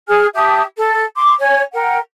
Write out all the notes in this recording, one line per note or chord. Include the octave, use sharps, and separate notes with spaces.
G#4 G#5 F6
G4 E5 A5 D#6
A4
C6 D6
C#5 G#5
A#4 F#5 G5